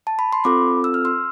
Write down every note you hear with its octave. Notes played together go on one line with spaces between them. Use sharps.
A5
B5
C6
C4 F4 A4 B5 D6
E6
F6
C6 E6